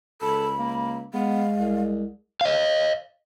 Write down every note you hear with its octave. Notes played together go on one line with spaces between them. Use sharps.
C#2 A4 B5
A#3
G#3 B3 F5
C2
D#5 F5